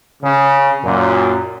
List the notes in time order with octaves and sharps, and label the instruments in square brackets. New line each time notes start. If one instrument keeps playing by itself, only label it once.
[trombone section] C#3
F#2 A#2